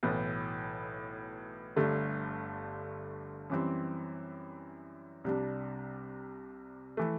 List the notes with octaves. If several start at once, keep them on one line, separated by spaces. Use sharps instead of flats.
B1 A2 E3 B3
G1 G2 D3 A3
F#2 E3 G3 C4
C2 C3 G3 D4
E3 A3